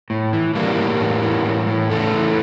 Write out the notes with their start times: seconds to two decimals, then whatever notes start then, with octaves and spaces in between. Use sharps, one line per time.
0.10 A2
0.33 E3
0.55 E3 G3 A#3
0.78 A2
1.00 A2
1.23 E3
1.45 A2
1.67 A2
1.90 E2 A3
2.13 E3